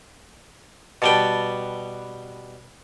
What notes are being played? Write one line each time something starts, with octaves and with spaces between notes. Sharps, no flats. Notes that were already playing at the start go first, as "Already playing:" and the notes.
B2 G3 B4 G5 A5